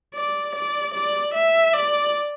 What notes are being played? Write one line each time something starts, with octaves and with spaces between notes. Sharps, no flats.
D5
D5
D5
E5
D5